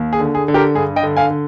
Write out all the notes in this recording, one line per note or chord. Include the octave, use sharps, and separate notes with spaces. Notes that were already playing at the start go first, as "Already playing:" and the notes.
Already playing: D#2
G#4
D3
G#4
D3
G4 A#4
G2 G#4
D#5 G5
D3
F5 G#5
D3